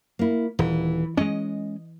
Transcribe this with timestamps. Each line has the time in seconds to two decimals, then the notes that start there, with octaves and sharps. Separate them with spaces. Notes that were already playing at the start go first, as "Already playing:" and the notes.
0.19 A#3 E4
0.59 D#1 E3
1.17 G#3 C#4 D#5